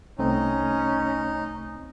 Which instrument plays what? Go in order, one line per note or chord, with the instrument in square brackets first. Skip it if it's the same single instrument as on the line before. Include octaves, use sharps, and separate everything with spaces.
[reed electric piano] C2 A3 C4 [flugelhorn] C#4 [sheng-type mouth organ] D#4